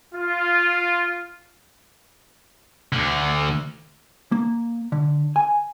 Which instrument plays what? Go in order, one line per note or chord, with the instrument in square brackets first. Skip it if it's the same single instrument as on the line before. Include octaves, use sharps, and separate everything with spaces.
[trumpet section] F4
[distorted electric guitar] D2 D3
[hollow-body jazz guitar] A#3
D3
G#5